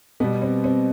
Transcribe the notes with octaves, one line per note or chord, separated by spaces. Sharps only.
B2 G3 B3
C4
C4